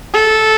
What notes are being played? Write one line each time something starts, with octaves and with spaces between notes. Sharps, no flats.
A4